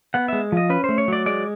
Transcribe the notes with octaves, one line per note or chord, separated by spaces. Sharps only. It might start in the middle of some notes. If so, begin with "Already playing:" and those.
B3 F#5
G#3 E5
F3 D#5
C#4 B4
A3 C5
C#5
F#3 D5
G#3 D5